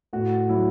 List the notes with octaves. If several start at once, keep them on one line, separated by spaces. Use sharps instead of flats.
A2 F#4
F#3 E4